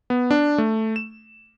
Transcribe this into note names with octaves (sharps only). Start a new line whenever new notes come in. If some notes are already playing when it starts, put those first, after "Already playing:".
B3
D4
A3
E7